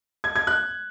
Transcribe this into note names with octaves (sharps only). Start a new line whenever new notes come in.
G#6
G#6
F#6